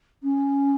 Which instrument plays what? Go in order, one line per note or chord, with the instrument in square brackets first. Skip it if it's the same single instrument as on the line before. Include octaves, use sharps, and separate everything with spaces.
[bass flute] C#4